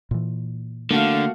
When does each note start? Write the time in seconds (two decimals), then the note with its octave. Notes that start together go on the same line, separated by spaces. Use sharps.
0.11 A#2 E3
0.91 D3 A3 A#3 F#4 F5